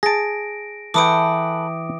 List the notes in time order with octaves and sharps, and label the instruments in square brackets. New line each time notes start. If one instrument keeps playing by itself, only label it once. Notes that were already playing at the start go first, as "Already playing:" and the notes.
[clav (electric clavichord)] G#4 A5 [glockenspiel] A#6 D7
[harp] E3 G5 [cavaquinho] A4 B4 G#5 [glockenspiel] D6 D#6 D7